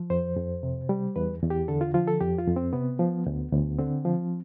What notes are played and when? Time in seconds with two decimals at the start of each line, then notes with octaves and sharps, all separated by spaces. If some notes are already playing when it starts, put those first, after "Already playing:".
Already playing: F3
0.10 F2 C5
0.37 F2
0.63 C3
0.89 G3
1.16 E2 B4
1.43 E2
1.50 G4
1.68 D3 A4
1.81 F4
1.94 F3 F4
2.08 A4
2.20 F2 G4
2.38 F4
2.48 F2
2.56 C4
2.73 C3 B3
2.99 F3
3.26 D2
3.52 D2
3.79 D3 C4
4.05 F3